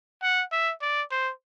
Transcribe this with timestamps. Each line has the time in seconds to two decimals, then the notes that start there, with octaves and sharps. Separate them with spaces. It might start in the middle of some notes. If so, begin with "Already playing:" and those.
0.23 F#5
0.52 E5
0.82 D5
1.11 C5